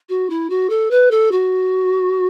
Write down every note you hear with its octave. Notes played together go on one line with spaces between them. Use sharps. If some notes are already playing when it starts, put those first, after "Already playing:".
F#4
E4
F#4
A4
B4
A4
F#4